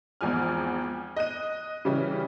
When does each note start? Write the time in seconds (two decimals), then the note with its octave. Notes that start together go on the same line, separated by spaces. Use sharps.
0.21 G#1 E2 F3 G#5 F6
1.16 D#5 F#6 D#7
1.85 C#3 E3 G3 C#4